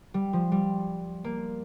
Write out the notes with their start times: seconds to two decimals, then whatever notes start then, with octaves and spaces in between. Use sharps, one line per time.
0.14 G3
0.33 F3
0.52 G3
1.24 A#3